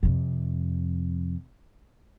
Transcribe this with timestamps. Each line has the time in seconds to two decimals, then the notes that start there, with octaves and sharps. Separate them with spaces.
0.03 F2 C3